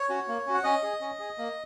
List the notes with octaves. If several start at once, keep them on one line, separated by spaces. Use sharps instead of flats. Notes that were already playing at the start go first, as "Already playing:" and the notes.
Already playing: C#5
C#4 F#4
A#3
C#4 F#4
F#5
C#4 D#5
G#4
C#4
G#4
A#3